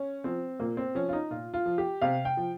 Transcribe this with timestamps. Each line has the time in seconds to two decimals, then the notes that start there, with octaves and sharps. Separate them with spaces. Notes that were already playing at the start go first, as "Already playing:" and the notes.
Already playing: C#4
0.24 F3 C4
0.60 A#2 A#3
0.77 C4
0.95 F3 C#4
1.09 F4
1.13 D#4
1.30 A#2 F4
1.54 F4
1.66 F3
1.78 G4
2.02 C3 F5
2.25 G5
2.37 F3